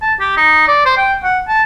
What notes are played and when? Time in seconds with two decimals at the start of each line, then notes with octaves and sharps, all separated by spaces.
0.02 A5
0.20 G4
0.37 D#4
0.68 D5
0.85 C5
0.97 G5
1.24 F#5
1.48 A5